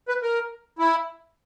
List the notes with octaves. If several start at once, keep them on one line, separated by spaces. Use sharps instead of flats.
B4
A#4
E4